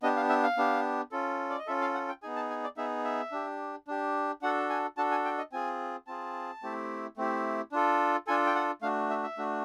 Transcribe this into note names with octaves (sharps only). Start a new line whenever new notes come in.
B3 D4 G4 D#5
F5
E5
F5
B3 D4 G4
C#4 F4 A4
D5
D#5
C#4 F4 A4 E5
F5
F#5
G5
B3 D#4 G#4 G#5
A5
G#5
D5
B3 D#4 G#4 E5
E5
D4 G4
D4 G4
D4 F#4 A4 F#5
G#5
D4 F#4 A4 A5
G#5
G5
D#5
C4 F4 G#4 G#5
C4 F4 G#4 A5
A3 C4 E4 G4
A3 C4 E4 G4
D4 F4 A4
D4 F4 A4 G#5
G5
F#5
A3 D4 F#4 F5
E5
E5
A3 D4 F#4